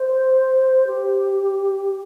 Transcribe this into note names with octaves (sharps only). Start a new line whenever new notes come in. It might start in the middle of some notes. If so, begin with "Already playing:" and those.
Already playing: C5
G4